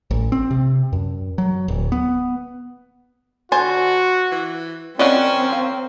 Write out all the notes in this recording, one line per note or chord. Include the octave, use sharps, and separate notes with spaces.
A1
C4
C3
F#2
F#3
D1
B3
D3 F#4 C5 G#5 A5
E3
C4 C#4 A#4 D5 D#5 F#5
F5